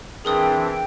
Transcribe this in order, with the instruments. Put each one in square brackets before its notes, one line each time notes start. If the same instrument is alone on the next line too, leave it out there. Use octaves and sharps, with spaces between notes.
[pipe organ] E3 C4 D4 [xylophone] G#4 A#4 D#6 [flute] G5